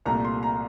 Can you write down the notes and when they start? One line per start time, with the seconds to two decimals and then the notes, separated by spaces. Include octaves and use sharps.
0.06 C2 A#2 A3 A#5
0.25 C6
0.43 A#5